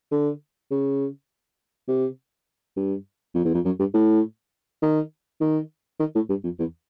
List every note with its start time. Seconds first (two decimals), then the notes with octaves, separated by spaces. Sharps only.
0.11 D3
0.71 C#3
1.88 C3
2.76 G2
3.35 F2
3.45 E2
3.54 F2
3.65 F#2
3.79 G2
3.94 A2
4.82 D#3
5.40 D#3
5.99 D#3
6.15 A2
6.29 G2
6.43 F2
6.59 E2